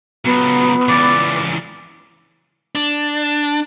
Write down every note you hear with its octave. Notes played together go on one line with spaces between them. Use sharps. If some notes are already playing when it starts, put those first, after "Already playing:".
C#2 F#3 B3
C#2 E3 D5
D4